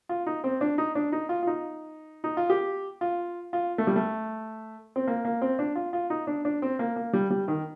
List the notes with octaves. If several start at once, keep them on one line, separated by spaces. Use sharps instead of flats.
F4
D#4
C4
D4
D#4
D4
D#4
F4
F4
D#4
D#4
F4
G4
F4
F4
A3
G3
A3
C4
A#3
A#3
C4
D4
F4
F4
D#4
D4
D4
C4
A#3
A#3
G3
G3
D#3